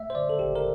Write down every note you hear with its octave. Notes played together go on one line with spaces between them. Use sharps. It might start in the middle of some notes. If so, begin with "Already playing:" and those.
Already playing: A3 E5
C5
D3 D5
A4
G1 G4
A#4